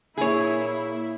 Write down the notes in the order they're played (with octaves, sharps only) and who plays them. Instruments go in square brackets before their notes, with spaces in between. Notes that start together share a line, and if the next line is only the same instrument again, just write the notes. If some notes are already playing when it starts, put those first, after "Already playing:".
[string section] A#2 [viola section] E4 [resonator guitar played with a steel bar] G#4 C#5